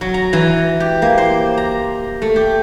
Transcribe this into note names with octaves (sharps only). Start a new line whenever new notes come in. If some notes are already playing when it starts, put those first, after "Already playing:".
F#3
A#5
E3
G4
A#3
C5
A#5
A3
G4